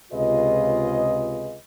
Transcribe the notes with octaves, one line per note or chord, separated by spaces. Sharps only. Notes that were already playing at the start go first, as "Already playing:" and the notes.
C#2 C3 F4 G#4 B4 D#5